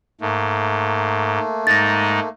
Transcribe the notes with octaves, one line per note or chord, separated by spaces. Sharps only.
G#2 A3 A#3
G#2 G#3 D#4 A6 A#6